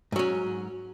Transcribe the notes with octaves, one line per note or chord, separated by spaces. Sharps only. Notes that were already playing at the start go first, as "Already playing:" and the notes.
G#2 F#3 C#4